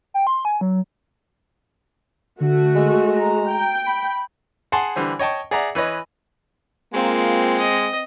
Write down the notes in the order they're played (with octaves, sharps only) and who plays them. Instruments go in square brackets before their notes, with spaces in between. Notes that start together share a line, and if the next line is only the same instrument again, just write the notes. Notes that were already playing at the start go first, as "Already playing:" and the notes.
[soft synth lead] G5
C6
G#5
F#3
[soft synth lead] D3 [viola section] A3 F#4
[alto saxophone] G#3
[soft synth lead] A#5
[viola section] G5
[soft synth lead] B5
[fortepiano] G#4 F#5 G#5 A5 C6
D3 E3 G3 C5
C#5 D#5 G5 A5 C#6
G#4 D5 E5 F#5 A#5
E3 B4 C#5 D#5
[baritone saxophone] G#3 [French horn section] A#3 F4 [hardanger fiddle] C4
[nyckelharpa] D#5